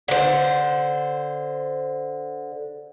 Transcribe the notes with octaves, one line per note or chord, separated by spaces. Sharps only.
D3 C5